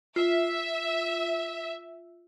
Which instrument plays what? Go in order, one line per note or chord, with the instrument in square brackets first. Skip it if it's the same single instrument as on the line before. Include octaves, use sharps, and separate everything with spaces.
[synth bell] F4 [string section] E5